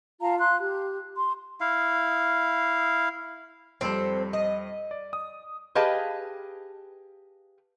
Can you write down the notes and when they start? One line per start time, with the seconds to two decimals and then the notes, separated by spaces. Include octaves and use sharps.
0.21 F4 F5 A5 A#5
0.38 F5 C6 F#6
0.58 G4
1.16 C6
1.61 E4 F5
3.81 F2 G3 C4 A4
4.33 D#5
4.91 D5
5.13 D#6
5.75 G4 G#4 B4 D#5 F5 A5